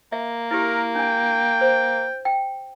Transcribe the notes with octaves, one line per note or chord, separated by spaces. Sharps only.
A#3 E5
E4 G4 A#4
D4 G5 G#5
C5
G5